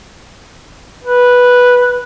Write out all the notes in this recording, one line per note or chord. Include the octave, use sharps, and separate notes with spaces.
B4